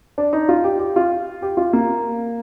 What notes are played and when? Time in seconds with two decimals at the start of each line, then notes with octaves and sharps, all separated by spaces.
0.18 D4
0.33 D#4
0.49 F4
0.64 G4
0.79 G4
0.96 F4
1.42 G4
1.57 F4
1.73 A#3